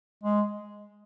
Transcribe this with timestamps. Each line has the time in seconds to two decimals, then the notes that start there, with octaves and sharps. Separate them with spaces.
0.24 G#3